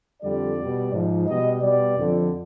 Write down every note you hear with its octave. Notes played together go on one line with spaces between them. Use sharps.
F2 D3 G3 D5
B2 G3
G#2 F3
B2 G3 D#5
B2 G3 D5
F2 D3 F3